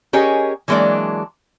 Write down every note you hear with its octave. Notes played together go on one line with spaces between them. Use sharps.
C#4 G4 G#4 A#4 C#5 D#5
E3 F#3 G#3 A#3 D4 D5